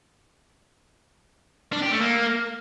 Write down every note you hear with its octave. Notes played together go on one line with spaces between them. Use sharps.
D4
G4
A3
A#3